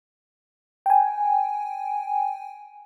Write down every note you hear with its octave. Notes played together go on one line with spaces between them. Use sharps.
G5 G#5